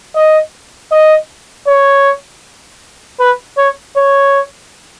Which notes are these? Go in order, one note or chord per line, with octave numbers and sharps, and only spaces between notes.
D#5
D#5
C#5
B4
C#5
C#5